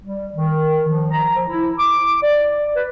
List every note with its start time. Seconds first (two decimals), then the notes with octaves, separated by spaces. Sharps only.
0.03 G3
0.34 D#3
0.88 F3
1.11 A#5
1.34 F3
1.49 E4
1.79 D6
2.23 D5
2.75 B4